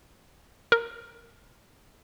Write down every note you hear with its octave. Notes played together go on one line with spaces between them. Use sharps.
A#4